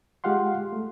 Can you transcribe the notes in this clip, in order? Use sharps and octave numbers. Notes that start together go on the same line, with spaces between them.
G#3 F4 G4 F5 F#5 C6
A3